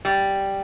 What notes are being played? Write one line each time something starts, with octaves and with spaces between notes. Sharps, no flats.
G3